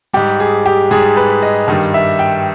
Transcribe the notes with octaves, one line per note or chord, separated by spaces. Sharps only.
G#2 G3 G4
G#4
G4
G#2 G3 G#4
B4
D#5
G2 D#3 G3
E5
G5